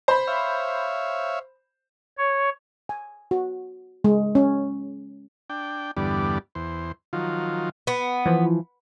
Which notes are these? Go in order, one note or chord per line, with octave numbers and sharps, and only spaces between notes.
C5 B5
C#5 E5 F5
C#5
G#5
F#4
G#3
C#4
D4 G5
E2 G2 D3 G3 B3 D5
E2 C5
D#3 F3 F#3 F4
B3
E3 F3